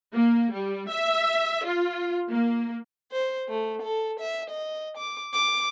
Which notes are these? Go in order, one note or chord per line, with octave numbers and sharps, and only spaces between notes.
A#3
G3
E5
F4
A#3
C5
A3
A4
E5
D#5
D6
D6